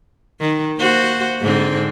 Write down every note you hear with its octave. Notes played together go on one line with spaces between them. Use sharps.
D#3
A#3 F#4 C5
G#2 D3 C4